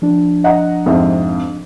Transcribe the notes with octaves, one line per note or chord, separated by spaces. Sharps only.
F3 D4
D#5 F#5 A#5
F2 G#2 C3